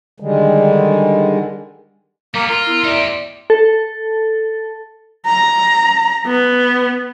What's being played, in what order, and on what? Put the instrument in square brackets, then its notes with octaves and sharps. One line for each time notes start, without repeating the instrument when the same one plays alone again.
[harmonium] D3 D#3 G3 G#3
[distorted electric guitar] G3 B3 [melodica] A#3
[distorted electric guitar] F4 [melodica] A#4
[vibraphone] B3 E4 C6
[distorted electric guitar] D#4 G4 [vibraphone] D5 E5 C6
[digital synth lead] A4
[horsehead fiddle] A#5
B3